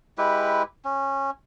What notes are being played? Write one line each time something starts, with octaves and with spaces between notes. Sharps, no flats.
G#3 E4 G4 B4
C#4